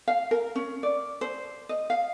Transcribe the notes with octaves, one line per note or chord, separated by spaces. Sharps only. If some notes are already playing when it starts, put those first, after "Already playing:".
F5
A#4
C#4
D5
C5
D#5
F5